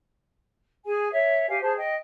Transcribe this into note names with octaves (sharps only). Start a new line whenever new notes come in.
G#4 G#5
C#5 E5
G4 F5 G#5
G#4 C5 A5
D#5 G5